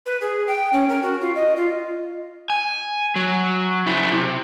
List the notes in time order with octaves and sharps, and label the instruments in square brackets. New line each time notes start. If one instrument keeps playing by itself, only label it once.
[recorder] B4
G#4
G5
C#4
A#4
F#4
F4
D#5
F4
[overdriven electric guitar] G#5
F#3
C#3 E4
C3